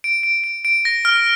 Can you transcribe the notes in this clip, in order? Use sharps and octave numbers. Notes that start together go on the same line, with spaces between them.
D7
D7
D7
D7
A#6
F6